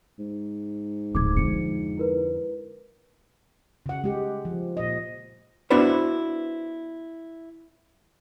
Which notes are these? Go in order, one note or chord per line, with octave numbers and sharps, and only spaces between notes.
G#2
D1 A2 D6 G#6
F2 D3 C#7
E4 A#4 B4
C#3 F#5
G#3 G4
F3
A#2 D#5
B3 D4 E4 F#4 B4 C5